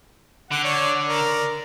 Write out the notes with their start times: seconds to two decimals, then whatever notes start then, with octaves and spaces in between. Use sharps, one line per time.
0.51 D3 F#5
0.64 C#5 D5
1.08 A#4 D5